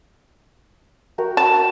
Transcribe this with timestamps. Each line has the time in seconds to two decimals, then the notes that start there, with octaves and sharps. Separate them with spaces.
1.18 F#4 A#4 G5
1.37 A5